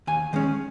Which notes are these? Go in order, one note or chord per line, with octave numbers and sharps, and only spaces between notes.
D#2 G#5
D#3 G#3 C#4